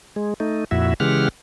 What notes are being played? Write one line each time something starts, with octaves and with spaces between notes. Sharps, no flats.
G#3
A3 D#4
F2 A#2 E4 F#4 E5
C#3 E3 G#3 G4 F#5 F6